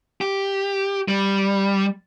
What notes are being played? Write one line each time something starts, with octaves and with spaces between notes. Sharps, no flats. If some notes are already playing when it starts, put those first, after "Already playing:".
G4
G3